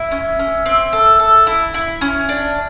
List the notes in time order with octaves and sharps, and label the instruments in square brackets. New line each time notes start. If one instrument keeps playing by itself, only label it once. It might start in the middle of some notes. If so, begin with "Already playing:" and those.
Already playing: [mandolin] E4 E5
C#4
C#4
C4
A4
A4
E4
E4
C#4
D4